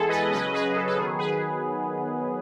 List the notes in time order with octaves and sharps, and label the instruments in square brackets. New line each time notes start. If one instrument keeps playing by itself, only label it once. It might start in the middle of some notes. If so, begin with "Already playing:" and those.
Already playing: [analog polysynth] E3 G#3 B3 G#4 A4
B4 D#5
C#3 F#3 C#4 B4 D#5
G#4 B4
A4
A4
D#3 F#3 B3 G#4
G#4 B4